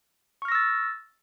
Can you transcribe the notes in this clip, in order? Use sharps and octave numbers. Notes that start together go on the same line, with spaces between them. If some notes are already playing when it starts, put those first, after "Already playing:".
C#6 E6 F6 A6 A#6